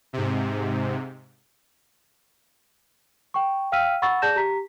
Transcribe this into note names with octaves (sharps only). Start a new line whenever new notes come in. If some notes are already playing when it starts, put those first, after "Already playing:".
G#2 C3
G5 C#6
F5 G5 E6 F6 B6 D#7
F#5 B5 C#6 E6 A6
G#4 D5 A5 G6 A#6 E7
G4 A#5 B6